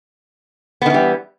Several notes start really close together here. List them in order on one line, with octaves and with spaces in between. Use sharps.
B3 D#3 E3 G3